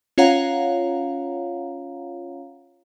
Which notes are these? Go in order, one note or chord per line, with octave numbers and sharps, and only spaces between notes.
C#4 F4 C#5 F5 F#5 A#5